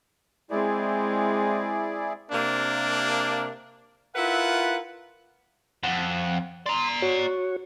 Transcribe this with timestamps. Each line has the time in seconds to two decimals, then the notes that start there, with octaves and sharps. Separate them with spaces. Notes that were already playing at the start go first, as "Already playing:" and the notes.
0.50 G#3 C4 E4 G#4 D5
2.32 C3 A#3 D4
4.16 E4 F4 A#4 B4 E5 F#5
5.83 F2 F#5
6.66 D5 A#5 C6
7.02 F#4 C#5